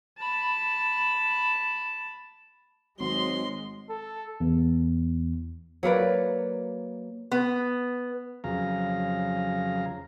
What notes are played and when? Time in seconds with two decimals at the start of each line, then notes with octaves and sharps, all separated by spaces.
0.18 A5 B5
3.00 G#1 F#3 G#3 C6
3.90 A4
4.40 E2
5.83 F#3 A#3 B4 D5
7.31 B3
8.44 F2 C#3 F#3 G#4 F5 A#5